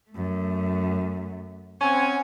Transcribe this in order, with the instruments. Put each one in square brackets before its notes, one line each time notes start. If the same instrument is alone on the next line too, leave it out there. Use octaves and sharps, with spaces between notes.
[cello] F#2 A3
[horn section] C4 C#4 G#5 [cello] F#5